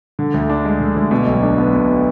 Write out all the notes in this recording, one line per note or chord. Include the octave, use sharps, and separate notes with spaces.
D3
D2
D4
G#3
D3
D2
B2
B1
D4
B3
B2